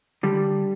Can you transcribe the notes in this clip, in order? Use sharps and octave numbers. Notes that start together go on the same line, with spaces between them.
D3 G3